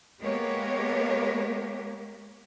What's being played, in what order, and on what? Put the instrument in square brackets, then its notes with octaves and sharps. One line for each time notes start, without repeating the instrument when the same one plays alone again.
[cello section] G#3 A#3 B3 G4 A#4 C#5